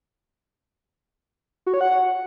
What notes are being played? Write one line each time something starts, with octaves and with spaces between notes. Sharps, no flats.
F#4
C#5
F#5